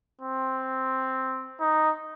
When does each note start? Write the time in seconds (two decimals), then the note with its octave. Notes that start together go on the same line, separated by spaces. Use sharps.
0.21 C4
1.60 D#4